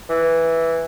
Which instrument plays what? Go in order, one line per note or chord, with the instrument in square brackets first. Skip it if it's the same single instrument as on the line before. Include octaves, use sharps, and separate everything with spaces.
[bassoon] E3